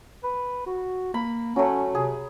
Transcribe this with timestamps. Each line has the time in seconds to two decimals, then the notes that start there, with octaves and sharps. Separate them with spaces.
0.24 B4
0.66 F#4
1.14 A#3 B5
1.56 F#3 A3 C#4
1.95 C3 G#4